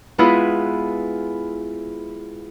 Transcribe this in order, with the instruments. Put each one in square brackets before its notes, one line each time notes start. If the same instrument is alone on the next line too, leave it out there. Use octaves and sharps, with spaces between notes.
[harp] G#3 B3 E4 F4 G#4 B4